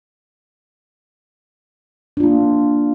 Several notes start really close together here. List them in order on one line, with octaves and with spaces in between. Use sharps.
D4 F4 A#3